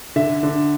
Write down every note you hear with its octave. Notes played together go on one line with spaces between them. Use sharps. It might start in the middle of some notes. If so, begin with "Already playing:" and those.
D3 E5
D3